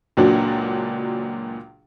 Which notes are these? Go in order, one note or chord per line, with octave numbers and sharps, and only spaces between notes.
C#2 A#2 F#3 D4 F#4